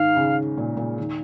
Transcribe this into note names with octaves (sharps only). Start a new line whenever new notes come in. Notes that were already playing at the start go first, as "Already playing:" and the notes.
Already playing: G#2 D#3 F5
C#3
A#2
A#2
D#3